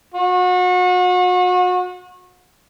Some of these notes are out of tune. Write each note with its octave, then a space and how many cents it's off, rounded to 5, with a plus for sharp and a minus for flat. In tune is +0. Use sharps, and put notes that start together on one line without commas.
F#4 -35